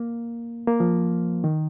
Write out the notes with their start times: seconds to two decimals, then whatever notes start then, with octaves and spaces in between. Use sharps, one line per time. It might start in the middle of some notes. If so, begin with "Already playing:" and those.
Already playing: A#3
0.68 A#3
0.80 F3
1.44 D#3